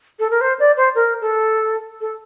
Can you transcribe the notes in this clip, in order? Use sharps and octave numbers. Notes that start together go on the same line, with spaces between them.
A4
A#4
C5
D5
C5
A#4
A4
A4